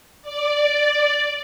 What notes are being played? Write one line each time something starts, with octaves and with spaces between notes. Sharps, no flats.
D5